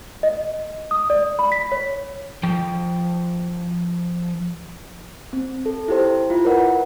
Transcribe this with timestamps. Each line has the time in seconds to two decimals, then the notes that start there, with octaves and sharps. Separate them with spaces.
0.23 D#5
0.91 D#6
1.10 D5
1.39 B5
1.52 B6
1.72 C#5
2.43 F3 G5
5.33 C4
5.66 A4
5.88 E4 G4 C5
6.30 E4 F4
6.45 A#4 B4 D5 F#5